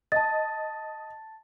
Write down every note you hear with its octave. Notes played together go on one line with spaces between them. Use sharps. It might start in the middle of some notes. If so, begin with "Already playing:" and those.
D#5 A5 A6